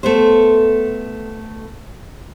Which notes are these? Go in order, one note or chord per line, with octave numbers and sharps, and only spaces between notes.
A3 B3 C5